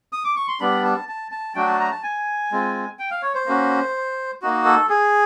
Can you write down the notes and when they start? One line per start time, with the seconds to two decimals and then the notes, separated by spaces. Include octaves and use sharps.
0.13 D#6
0.24 D6
0.36 C#6
0.48 C6
0.60 G3 B3 D4 B5
0.84 A5
1.09 A5
1.32 A5
1.55 F#3 A3 D4 F#4 G5
1.67 A5
1.80 A#5
1.92 A5
2.03 G#5
2.52 G#3 C4 F4
2.99 G5
3.11 F5
3.22 C#5
3.35 C5
3.46 A#3 C#4 F#4
4.42 A#3 D#4 F#4
4.65 A4
4.89 G#4